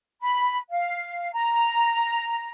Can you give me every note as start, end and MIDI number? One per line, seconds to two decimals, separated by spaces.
0.21 0.58 83
0.70 1.30 77
1.33 2.51 82